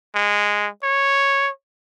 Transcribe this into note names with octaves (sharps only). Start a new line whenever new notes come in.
G#3
C#5